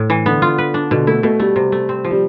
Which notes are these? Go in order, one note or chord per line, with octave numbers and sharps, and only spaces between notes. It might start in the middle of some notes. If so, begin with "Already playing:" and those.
Already playing: A2
E3
D3 B3
F4
B4
D4
B2 D3
A3 E4
B2 A3
G3 A3
C3
A3
C4
F3
G3